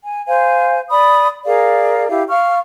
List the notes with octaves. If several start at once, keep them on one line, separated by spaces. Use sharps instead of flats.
G#5
C5 F5 G#5
D5 B5 D#6
G#4 A#4 D5 F5
E4 G4 F5
F5 C#6 F6